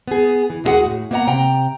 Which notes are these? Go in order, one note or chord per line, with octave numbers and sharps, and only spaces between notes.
B3 G#4
E3
D#2 G#3 D#4 F#4 G#4 F#5
A2
A#3 B3 C5 D5 F#5 A#5
C3 G5 A#5